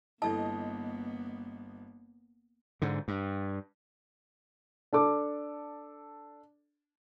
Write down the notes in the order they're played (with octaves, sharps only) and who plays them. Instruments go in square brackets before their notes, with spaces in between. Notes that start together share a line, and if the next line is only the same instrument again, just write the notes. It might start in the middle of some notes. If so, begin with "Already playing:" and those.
[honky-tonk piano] G1 D#5 [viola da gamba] A#3 B3 [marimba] E4 A4 [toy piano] A5
[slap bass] G#2 D3
G2
[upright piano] D4 A4 D6